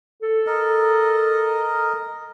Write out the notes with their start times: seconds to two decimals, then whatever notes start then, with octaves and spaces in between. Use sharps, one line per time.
0.22 A4
0.47 A#4 D#5